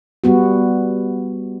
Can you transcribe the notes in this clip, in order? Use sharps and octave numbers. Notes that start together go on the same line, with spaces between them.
G3 B3 F#4